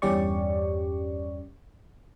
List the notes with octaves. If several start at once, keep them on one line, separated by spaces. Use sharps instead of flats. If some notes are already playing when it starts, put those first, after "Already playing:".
E2 G2 C#4 G4 D5 C#6